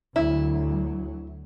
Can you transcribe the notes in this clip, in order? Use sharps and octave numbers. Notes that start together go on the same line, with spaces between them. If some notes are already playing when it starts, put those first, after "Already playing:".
D2 F#3 E4